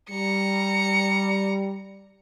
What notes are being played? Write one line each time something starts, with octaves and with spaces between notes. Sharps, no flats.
G3 A#5 C#7